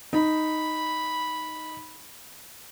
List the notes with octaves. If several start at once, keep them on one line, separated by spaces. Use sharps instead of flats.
D#4 B5